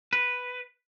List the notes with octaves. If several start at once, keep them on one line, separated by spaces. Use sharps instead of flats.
B4